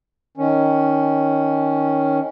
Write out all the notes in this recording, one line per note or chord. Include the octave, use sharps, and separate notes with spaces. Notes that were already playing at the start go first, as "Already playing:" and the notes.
D#3 C#4